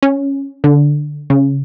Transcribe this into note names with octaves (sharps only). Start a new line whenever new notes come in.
C#4
D3
C#3